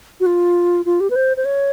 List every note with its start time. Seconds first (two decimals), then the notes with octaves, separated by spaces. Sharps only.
0.20 F#4
0.26 F4
0.85 F4
1.00 G4
1.10 B4
1.16 C5
1.37 C5
1.45 C#5